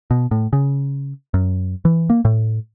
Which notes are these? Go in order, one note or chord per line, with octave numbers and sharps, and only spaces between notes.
B2
A2
C#3
F#2
E3
A#3
A2